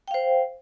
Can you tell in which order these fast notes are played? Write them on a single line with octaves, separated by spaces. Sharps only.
G5 F5 C5